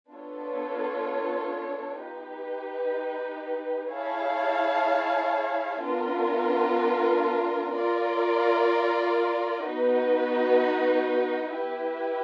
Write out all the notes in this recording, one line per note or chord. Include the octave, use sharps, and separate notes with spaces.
B3 D4 F4 A4 C#5
D#4 G4 B4
E4 G#4 C#5 F5 A5
B3 D4 F4 A#4
F4 A#4 D5
B3 D#4 F#4 B4
E4 G4 B4